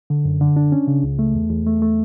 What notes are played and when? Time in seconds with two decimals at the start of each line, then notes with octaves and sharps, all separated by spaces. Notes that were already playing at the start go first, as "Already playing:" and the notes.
0.10 D3
0.25 F#2
0.41 D3
0.56 D4
0.72 C#4
0.87 C#3
1.03 C#2
1.19 A3
1.35 E2
1.50 E2
1.66 A3
1.82 A3